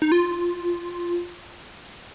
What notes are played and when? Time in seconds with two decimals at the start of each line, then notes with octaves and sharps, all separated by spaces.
0.02 D#4
0.12 F4